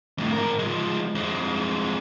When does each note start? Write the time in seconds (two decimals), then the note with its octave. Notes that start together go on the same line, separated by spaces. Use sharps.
0.18 F2 A2
0.33 G#2 A#4
0.59 F3 G#3
1.15 F2 G#3